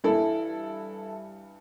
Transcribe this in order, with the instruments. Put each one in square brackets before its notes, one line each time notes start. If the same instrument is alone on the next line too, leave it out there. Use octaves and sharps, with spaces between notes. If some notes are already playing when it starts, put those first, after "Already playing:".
[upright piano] G2 E3 E4 A4